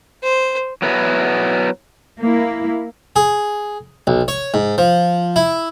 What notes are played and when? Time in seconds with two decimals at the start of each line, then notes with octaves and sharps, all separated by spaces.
0.23 C5
0.82 F#3 B3 E4
2.20 A#3 E4
3.16 G#4
4.07 B1
4.28 C#5
4.54 G#2
4.78 F3
5.36 E4